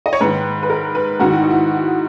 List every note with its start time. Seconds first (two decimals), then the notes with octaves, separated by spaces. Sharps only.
0.06 D#5
0.13 C#5
0.21 G#2 D#3 B4
0.63 B4
0.70 A#4
0.95 B4
1.20 G#2 D#3 F#4
1.30 E4
1.41 D#4
1.50 E4